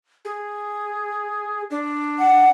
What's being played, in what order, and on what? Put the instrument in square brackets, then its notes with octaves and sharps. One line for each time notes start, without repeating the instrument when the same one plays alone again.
[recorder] G#4
D4
[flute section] F#5